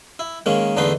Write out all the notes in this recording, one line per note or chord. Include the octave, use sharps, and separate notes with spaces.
E4
D#3 G#3 A#3 C#4
E2 D3 A3 D#4 B4 C6